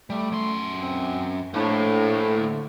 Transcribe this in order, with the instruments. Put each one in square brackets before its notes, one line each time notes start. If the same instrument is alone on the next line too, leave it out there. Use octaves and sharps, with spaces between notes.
[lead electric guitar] G3 [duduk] A3
[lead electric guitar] F#2 C6
[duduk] C4
[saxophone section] A2 [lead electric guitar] A#3 C5 [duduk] D4
[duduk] D3